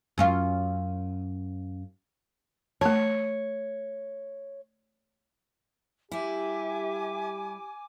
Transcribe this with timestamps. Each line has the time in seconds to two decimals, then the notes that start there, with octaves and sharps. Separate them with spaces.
0.18 F#2 C#4 F4
2.81 A3 C#5 A5
6.12 G3 E4 G4 E5 G#5 D6